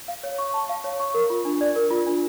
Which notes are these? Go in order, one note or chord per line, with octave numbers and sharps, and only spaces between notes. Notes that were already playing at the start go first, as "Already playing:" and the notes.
F5
C#5
C#6
A5
F5
C#5
C#6
A#4
F4
D4
D5
A#4
F4
D4